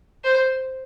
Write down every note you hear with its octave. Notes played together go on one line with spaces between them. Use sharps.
C5